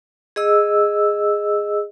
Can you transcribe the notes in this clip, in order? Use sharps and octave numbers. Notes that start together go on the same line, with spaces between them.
G#4 D#5 E6